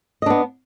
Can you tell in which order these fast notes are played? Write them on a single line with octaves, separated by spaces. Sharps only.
D#5 D4 B3